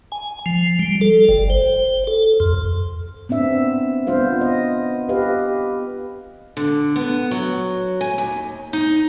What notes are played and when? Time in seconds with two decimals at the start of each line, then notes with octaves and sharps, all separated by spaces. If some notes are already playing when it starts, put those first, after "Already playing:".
0.12 G#5
0.46 F3
0.79 G3
1.01 A4
1.29 G1
1.50 C5
2.07 A4
2.40 F2
3.29 B3 C4 D4 E5
4.07 B3 D4 F4 C5 F5
4.41 D#5
5.09 G4 B4 D#5 F5
6.57 D3
6.96 B3
7.31 F#3
8.01 G#5
8.18 D#2
8.73 D#4